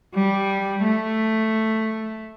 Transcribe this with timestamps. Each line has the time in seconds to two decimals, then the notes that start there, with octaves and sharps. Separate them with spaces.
0.14 G3
0.83 A3